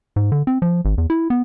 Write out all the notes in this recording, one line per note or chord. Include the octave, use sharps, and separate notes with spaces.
G#2
D3
C4
F3
G#1
E2
E4
B3